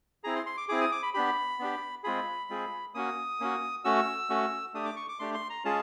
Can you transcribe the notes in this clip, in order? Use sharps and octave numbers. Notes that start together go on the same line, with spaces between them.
C4 E4 G#4 A#5
C6
C6
D6
C4 E4 G#4 D6
D#6
D6
B5
B3 D4 G4 B5
B3 D4 G4
G#3 C4 F4 G#4 B5
G#3 C4 F4 G#4
A#3 C#4 F#4 D#6
A#3 C#4 F#4
A3 C#4 F#4 E6
A3 C#4 F#4
A3 D4 G4 D#6
D6
C#6
D6
A3 D4 G4 C6
C6
A#5
G#3 C#4 F4 G#4 A5